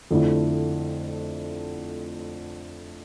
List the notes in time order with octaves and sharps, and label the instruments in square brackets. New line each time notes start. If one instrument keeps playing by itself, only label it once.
[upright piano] F2 D3 A3 E4